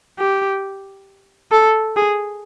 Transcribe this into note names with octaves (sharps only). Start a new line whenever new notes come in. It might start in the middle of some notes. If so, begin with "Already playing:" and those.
G4
A4
G#4